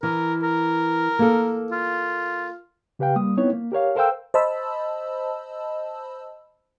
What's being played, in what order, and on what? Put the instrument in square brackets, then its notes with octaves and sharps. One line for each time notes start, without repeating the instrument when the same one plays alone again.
[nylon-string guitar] E3 [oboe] A#4
[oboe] A#4
[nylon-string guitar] A#3 A4
[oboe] F4
[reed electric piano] C#3 G4 B4 F5 G5
G3 A#3 D#6
B3 C4 D#4 E4 C#5
A#3
G4 A#4 C#5 F5
A4 A#4 C5 F5 G5 E6
[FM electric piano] C5 D#5 A5 B5 E6